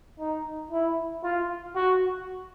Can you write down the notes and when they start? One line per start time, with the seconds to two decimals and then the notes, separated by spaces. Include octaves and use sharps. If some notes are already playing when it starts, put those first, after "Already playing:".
0.20 D#4
0.71 E4
1.23 F4
1.75 F#4